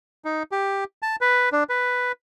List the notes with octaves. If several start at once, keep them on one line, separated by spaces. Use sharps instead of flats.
D#4
G4
A5
B4
D4
B4